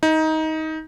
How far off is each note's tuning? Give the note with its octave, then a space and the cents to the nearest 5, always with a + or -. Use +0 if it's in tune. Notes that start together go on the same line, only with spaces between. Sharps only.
D#4 +20